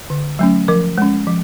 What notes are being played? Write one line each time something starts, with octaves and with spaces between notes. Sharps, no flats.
D3
F#3 A3 C#4
F3 A#4
G#3 C#4
F3